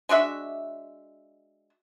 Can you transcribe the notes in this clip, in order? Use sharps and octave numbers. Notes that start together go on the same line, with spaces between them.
G#3 D4 F#4 E5